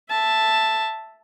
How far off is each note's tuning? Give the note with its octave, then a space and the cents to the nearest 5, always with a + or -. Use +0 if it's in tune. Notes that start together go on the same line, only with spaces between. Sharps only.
E5 +0 A5 +0